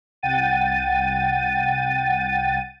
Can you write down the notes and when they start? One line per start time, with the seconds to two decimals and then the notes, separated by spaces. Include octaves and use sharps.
0.23 C2 F#5 G5 A6 D#7